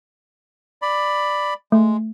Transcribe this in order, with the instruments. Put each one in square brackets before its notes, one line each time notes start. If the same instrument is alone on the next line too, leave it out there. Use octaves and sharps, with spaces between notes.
[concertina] D5 B5
[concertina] G#3 [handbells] A3